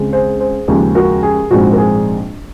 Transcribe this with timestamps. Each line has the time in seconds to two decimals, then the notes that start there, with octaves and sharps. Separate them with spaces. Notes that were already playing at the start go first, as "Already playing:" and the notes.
Already playing: C#2 C#3 G#3 C4
0.13 G#4 C5
0.40 G#4 C5
0.68 D#2 C#3 F3 G#3
0.95 F#4 A#4
1.23 G#4
1.51 A#1 G#2 F3 G#3 C4 F#4
1.72 A#4
1.78 G#4